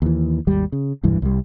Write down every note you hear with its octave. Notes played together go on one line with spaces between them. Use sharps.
D#2 E3
G#1 D#2 G3
C#3
E1 C2 G2 E3
C2 G3